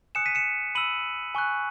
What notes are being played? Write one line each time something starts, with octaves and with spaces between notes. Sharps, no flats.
G#5 D#6 F#6 C#7 E7
B6 D#7
C#7 E7
B5 E6 D#7 F#7
G#5 C#6 F#6